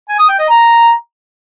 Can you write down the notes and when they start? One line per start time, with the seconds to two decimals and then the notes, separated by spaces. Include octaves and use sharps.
0.09 G#5
0.19 D#6
0.29 G5
0.39 D#5
0.49 A#5